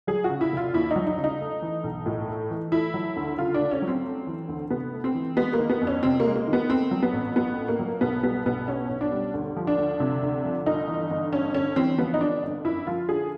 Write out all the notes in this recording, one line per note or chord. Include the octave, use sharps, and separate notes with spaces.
F#3 G#4
F#4
C#3
E4
F1
F4
D#2 E4
D#4
F#3
D#4
C#3
D#4
A3
E3
B1
A2
A3
E3
A3 E4
F#3
D2
C#3 F4
D4
A3
C#4
F#3
C4
A3
E3
D2
C3 B3
A3
C4
E3
G#3 B3
A#3
D#3
B3
F2
C#4
C3 C4
A#3
G#3
A#3
D#3
B3
A3 C4
F#3
B3
A1
A2 B3
A3
A#3
F#3
B1 B3
G3 B3
B1 B3
B2 C#4
B1
D4
G3
D2
F3
D4
D2
C3
D2
F3
G1 D#4
E3
G1
G2 C#4
G1 C#4
E3 C4
F3 B3
D#4
D3 D4
G1
F#2 E4
F3 F4
D3 G#4